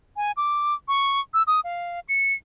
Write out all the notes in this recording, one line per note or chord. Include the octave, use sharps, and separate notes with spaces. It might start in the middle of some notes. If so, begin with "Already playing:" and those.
G#5
D6
C#6
E6
D#6
F5
C#7